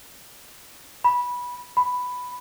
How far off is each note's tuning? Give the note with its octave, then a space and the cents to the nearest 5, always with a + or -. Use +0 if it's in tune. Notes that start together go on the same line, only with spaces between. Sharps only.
B5 -15
B5 +5